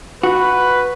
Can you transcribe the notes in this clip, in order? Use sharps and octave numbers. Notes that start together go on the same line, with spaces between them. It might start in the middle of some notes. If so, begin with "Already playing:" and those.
F#4 B4